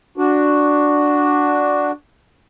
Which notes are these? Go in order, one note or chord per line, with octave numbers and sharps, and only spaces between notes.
D4 F#4